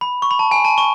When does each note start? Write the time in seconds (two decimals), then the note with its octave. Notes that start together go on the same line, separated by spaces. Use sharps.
0.01 B5
0.22 C#6
0.31 B5
0.39 A5
0.51 G#5
0.65 A5
0.78 C#6